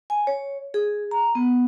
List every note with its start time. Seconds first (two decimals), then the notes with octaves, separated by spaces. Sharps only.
0.10 G#5
0.27 C#5
0.74 G#4
1.11 A#5
1.35 B3